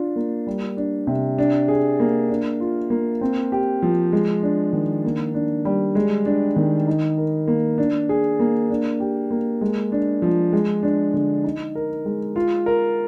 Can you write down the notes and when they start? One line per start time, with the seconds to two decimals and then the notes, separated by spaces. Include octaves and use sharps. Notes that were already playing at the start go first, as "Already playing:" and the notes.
Already playing: D4 F4
0.16 A#3
0.47 G3
0.77 D4
1.07 C3
1.39 D4
1.68 G#4
2.00 A#3
2.29 D4
2.60 F4
2.90 A#3
3.21 C4
3.52 G4
3.82 F3
4.12 G#3
4.43 D4
4.73 D#3
5.05 A#3
5.34 D4
5.65 G3
5.95 G#3
6.26 D4
6.56 D#3
6.88 D#4
7.18 A#4
7.47 A#3
7.78 D4
8.09 G#4
8.39 A#3
8.70 D4
9.00 G4
9.31 A#3
9.61 G#3
9.92 D4
10.22 F3
10.53 G#3
10.83 D4
11.14 D3
11.44 D#4
11.75 A#4
12.05 G#3
12.36 F4
12.66 A#4